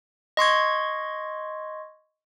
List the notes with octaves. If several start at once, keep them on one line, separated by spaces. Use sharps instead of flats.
D#5 C6 C#6 G#6